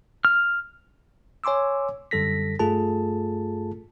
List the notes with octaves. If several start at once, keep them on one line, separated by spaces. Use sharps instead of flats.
F6
C#5 G#5 C6 D6 E6
F#2 D3 G3 A4 A#6 B6
G2 A3 F4 G#4 A4 A5